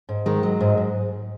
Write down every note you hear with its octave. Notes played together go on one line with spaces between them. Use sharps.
G#2
D#3 G#3
F#3
G#2
G#2